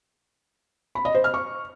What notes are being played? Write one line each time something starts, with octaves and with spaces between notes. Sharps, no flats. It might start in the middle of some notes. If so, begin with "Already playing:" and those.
B5
D#5
C5
F6
C#6